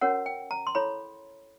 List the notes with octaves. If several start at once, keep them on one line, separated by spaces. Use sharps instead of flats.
C#4 F#4 A#4 C#5 F#5
G5
A#5
C6
E4 A4 C#5 B5